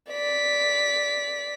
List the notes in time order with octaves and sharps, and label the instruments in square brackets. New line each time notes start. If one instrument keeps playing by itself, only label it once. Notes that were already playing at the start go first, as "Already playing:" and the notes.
[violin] D5 B6